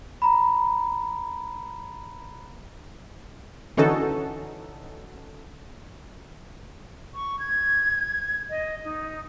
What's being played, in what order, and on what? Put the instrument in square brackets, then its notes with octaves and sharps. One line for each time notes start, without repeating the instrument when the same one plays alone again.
[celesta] A#5 B5
[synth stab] D3 E3 C#4 D#4 F#4 A4
[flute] C#6
G#6
D#5
D#4